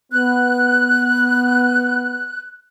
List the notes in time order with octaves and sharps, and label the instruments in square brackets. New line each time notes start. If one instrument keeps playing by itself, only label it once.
[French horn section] B3 [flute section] F#6